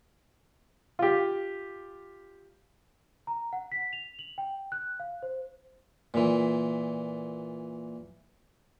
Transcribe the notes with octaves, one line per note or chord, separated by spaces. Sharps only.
F4 G4
A#5
F#5
B6
F7
F#7
G5
F#6
F5
C5
A#2 E3